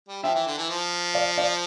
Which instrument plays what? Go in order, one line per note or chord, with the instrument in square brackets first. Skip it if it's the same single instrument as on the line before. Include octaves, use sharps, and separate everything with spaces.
[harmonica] G3
[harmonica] F3 [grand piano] E5 G5
[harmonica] E3
D3
E3
F3
[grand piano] D5 F5
D5 F5